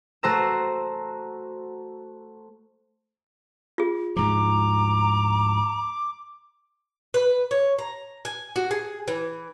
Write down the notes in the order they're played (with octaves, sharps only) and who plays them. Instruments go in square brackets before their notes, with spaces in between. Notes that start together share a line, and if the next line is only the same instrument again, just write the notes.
[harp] A3 F#4 C5 A#5 E6
[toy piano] F4 G#4
[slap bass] D2 G#2 F3 [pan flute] A#5 [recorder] D6
[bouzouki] B4
C#5
A#5
G#5
F#4
G#4
E3